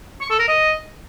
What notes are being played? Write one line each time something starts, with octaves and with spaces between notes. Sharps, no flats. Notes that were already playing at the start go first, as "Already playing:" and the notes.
C#6
A4
A#4
D#5